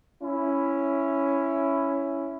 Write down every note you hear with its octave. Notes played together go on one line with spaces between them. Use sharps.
C#4 E4